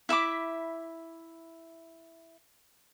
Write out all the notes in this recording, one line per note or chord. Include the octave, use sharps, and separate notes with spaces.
E4 E5 B5 D6